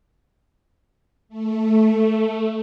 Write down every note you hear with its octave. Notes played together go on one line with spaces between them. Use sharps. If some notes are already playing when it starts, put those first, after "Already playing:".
A3